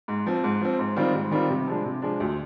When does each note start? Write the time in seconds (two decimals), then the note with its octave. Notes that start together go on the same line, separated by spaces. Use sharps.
0.08 G#2
0.26 F3 C4
0.44 G#2
0.61 F3 C4
0.79 G#2
0.96 D#3 G3 C4 F4
1.14 G#2
1.31 D#3 G3 C4 F4
1.50 C3
1.67 F3 G#3 D4
1.85 C3
2.02 F3 G#3 D4
2.20 D2